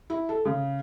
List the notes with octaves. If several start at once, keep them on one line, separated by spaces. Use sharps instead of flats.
E4
A4
C#3